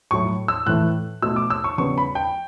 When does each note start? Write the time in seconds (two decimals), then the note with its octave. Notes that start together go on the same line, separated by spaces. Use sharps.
0.11 A2 F#3 A3 C#6
0.48 E6
0.66 A2 E3 A3 F#6
1.22 B2 A3 E6
1.36 D6
1.50 E6
1.64 C#6
1.78 C#3 G3 B3 C#6
1.98 B5
2.15 G5